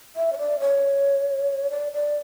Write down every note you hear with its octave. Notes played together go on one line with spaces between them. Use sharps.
E5
C#5
D5
C#5
D5
D5